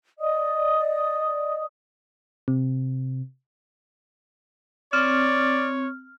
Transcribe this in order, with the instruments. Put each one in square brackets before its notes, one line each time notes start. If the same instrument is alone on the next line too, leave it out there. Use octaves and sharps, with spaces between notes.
[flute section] D5 D#5 D#6
[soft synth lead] C3
[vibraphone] C4 [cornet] C#5 [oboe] D5 [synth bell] F6